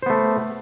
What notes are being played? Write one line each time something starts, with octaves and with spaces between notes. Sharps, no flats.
A3 B3 C5